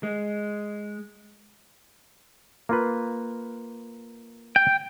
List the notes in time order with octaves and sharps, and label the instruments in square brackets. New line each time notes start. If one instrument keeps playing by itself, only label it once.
[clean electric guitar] G#3
[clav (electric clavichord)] A#3 F4 B4
[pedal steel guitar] G5